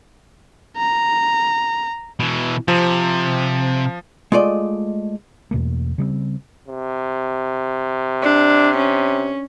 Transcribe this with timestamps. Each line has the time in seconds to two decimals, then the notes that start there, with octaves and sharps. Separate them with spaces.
0.77 A#5
2.20 B2 E3
2.68 C3 F3
4.32 G#3 A3 F4 D5 D#5
5.51 E2 B2 A3 A#3
5.98 C#3 G3 A3 C4
6.68 C3
8.23 D4
8.77 C#4